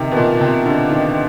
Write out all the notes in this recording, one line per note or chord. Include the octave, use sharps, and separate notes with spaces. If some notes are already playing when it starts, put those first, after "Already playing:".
Already playing: C3 D#3
B2
A#2
C3
D3
D#3